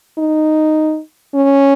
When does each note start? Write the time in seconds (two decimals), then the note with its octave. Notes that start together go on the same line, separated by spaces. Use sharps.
0.18 D#4
1.34 C#4